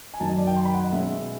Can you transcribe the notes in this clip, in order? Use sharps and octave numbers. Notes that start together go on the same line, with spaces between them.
G#5
F#2 D#3 F#3 A5
D#5
D5
G5
C6
B5
F#5
D#5
B2 G#3 C#4 E5